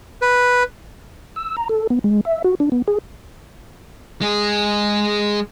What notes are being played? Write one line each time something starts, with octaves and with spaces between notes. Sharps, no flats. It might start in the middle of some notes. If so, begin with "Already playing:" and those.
B4
E6
A#5
A4
B3
G#3
E5
F#4
D4
B3
G#4
G#3 G#4